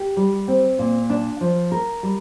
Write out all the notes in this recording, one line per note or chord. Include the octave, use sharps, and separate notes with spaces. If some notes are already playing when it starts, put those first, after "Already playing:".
Already playing: G4
G3
C4
A#2
D4
F3
A#4
G3